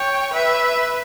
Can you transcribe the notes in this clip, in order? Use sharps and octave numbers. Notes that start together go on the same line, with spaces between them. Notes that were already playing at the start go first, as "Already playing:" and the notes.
Already playing: C#5 G5
B4 E5